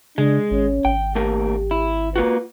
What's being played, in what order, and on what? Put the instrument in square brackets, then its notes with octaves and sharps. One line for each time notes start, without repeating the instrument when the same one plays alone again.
[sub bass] C#3 [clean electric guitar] G#3 [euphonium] D4
[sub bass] G#1 [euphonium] C#4
[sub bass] G#1 [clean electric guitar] G5
[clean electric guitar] D#2 A3 A#4 [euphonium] G4
[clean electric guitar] E4
[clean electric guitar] A#3 F4 F#4 [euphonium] B4